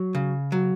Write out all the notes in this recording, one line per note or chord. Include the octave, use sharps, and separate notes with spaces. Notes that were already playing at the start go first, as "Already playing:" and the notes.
Already playing: F#3
C#3
F#3